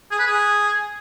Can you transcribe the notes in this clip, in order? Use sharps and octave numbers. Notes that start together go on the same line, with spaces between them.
G#4
B4
G#4